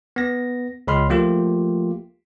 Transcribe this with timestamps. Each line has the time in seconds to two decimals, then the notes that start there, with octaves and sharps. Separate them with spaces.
0.16 B3 A#6
0.87 C#2 B5 C6 F6
1.10 F3 A3 A#3 F4 G4